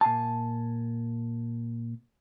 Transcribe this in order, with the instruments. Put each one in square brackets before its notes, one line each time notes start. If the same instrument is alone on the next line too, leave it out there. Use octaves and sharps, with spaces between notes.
[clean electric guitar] A#2 F5 G#5 A5